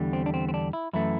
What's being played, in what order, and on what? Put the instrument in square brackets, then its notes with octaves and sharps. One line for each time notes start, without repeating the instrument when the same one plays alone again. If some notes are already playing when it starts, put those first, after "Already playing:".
Already playing: [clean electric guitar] E2 D3 G3
C4
D4
C4
C4
D4
E4
F#2 E3 A3 E4